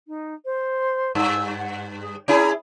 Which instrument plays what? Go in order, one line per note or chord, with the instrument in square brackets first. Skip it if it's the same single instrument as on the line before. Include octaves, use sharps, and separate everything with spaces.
[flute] D#4
C5
[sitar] G2 [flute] E6
[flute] F#5
G#4
[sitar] C#4 E4 G#4 [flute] A#5